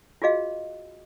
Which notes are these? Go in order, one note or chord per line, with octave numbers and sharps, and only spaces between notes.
F4 F#4 G#4 D#5 F5